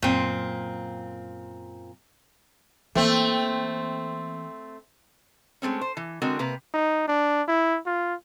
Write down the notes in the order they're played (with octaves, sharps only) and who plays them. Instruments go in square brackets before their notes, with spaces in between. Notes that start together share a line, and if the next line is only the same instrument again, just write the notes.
[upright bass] F#2 [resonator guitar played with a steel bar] A#2 C4
[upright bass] E3 A#3 [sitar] A3 C4
[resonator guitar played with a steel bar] G#3 A3 C4 C#4
C5
E3
D3 G#3 C4 F#4 A#4
C3 A#3 B4 A#5
[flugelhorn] D#4
D4
E4
F4